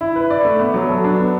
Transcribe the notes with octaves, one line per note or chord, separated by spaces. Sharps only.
E4
B4
D5
A3
B3
F#3
A4
D4
B3